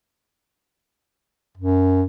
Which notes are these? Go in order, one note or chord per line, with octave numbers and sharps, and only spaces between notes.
F#2